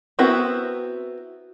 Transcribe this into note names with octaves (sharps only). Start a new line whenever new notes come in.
B3 C4 E4 F#4 A#4